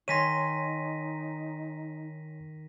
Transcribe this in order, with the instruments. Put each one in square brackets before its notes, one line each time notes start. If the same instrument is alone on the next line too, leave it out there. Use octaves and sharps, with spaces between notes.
[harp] D#3 [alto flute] D#4 [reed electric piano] C#5 G#5 C6 [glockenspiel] A#6 B6 D#7